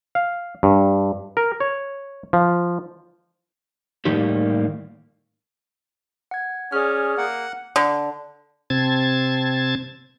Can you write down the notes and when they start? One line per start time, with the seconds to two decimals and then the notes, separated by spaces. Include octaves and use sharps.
0.15 F5
0.63 G2
1.37 A#4
1.60 C#5
2.33 F3
4.05 A2 D#3 G3 A#3 D#4 G4
6.31 F#5 G#6
6.72 C#4 G#4 D5 F6
7.17 A#3 F#5
7.76 D3
8.70 C3 C4 A5 G#6 A6